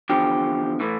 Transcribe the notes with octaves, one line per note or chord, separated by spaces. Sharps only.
E2 D3 F3 G4
A2 E3